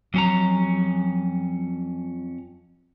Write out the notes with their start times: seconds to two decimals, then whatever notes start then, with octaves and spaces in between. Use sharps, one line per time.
0.14 F2 F#3 C#4 A#5